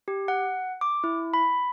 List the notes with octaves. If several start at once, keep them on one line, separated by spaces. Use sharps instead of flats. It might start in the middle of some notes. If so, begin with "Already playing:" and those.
G4
F#5
D6
E4
B5